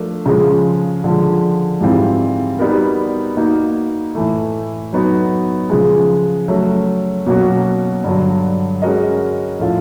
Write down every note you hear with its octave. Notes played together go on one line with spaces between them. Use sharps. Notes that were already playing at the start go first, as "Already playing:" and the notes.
Already playing: F3 A3 D4 A#4
C#3 F3 G#3
D3 F3 G#3
G#2 E3 G3 C4 F4
G3 B3 D#4 F#4 A#4
A#3 D#4 F#4
A2 E3 A3
F#3 B3 D#4 F#4
C#3 F3 G#3
F#3 A3 C#4
B2 F#3 A#3 C#4 F#4
G2 D3 F#3
G#3 C#4 F#4 A#4 D#5
A2 F3 A3 C#4 F4